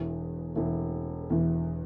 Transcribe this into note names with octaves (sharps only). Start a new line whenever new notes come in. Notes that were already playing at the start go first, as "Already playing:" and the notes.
Already playing: E1 E2 E3
E1 E2 E3
E1 E2 E3